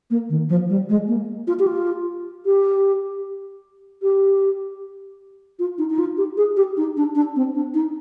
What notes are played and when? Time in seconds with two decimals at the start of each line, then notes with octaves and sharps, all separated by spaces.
0.10 A#3
0.29 D#3
0.49 F3
0.69 G3
0.89 G#3
1.08 A#3
1.47 F4
1.59 G4
1.67 F4
2.46 G4
4.02 G4
5.59 F4
5.78 D#4
5.90 D#4
5.99 F4
6.18 G4
6.37 G#4
6.56 G4
6.77 D#4
6.97 D4
7.15 D4
7.36 C4
7.55 D4
7.74 D#4